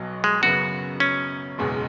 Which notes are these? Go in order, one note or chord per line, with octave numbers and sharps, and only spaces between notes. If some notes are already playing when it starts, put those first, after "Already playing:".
Already playing: B1 B2 F#3
G#3
F#2 C#3 F#3 B3 F#4
C#4
F#1 E2 B2 G#3